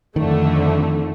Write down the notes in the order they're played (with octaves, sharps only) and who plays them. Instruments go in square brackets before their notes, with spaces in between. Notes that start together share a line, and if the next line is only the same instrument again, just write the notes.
[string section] F2 D3 A3 [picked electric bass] D#3